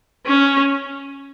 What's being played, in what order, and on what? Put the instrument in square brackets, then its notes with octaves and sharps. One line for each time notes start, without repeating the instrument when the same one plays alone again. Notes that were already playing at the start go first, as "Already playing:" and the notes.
[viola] C#4